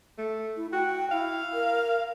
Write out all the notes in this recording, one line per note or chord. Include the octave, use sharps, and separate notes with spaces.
A3
E4
F#4 G5
E4 F5
A#4